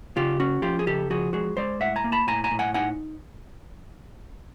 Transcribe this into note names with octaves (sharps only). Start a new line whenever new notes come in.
C#3 F4 G4
C#4 F#4
F3 F4 G4
G#4
C#3 G4 A4
F3 F#4 G#4
G#3 F#4 G#4
G#3 C5 D5
A2 E5 F#5
G#5 A#5
A#3
A5 B5
A2 G#5 A#5
G#5 A#5
A2
F#5 G#5
D#4 F#5 G#5